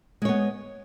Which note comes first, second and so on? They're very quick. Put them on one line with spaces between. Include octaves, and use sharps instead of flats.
G#3 C#5 B3